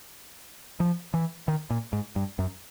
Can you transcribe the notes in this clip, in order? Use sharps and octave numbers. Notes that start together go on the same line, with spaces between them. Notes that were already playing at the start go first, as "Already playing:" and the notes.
F3
E3
D#3
A#2
G#2
G2
F#2